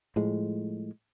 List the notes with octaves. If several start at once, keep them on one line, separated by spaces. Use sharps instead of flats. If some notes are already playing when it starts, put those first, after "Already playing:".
A2 F3 G#3